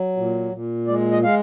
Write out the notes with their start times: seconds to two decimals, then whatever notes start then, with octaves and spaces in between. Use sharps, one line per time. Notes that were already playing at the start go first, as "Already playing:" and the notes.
Already playing: F#3
0.17 A#2
0.53 A#2
0.87 G#3 D5
1.11 D#5
1.23 G#3 F5